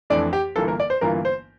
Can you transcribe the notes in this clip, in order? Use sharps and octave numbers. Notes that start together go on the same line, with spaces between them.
F2 E3 A3 D4 D5
G4
G1 G2 E3 A#3 F4 A4
A#4
D5
C5
G1 G2 E3 A#3 F4 A#4
C5